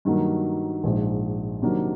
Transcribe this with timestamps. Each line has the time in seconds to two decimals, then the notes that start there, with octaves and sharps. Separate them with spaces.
0.05 G2 D#3 F#3 A#3
0.84 A#1 G#2 F3
1.62 C3 D#3 F#3 A#3 D4